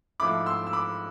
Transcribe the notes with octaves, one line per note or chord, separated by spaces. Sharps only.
G#2 F3 A3 E4 B5 D6
C6 E6
E6
B5 D6